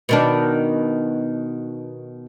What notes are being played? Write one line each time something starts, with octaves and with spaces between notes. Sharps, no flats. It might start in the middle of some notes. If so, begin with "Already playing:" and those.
B2 D#3 D4